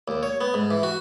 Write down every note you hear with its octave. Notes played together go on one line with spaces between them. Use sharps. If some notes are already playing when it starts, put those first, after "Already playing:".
D#2
C#5
B3
G#2
E3
F#4